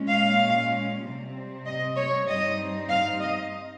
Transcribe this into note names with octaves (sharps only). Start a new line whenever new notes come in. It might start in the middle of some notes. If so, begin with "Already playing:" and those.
Already playing: A#2 G#3 C#4
F5
C3 G3 C4
D#5
C#5
G2 G3 C4 D#4 D#5
F5
D#5